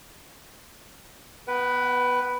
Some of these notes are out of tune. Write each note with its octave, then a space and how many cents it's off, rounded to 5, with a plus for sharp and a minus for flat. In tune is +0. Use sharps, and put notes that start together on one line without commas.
B3 -5 B4 +0 G5 -45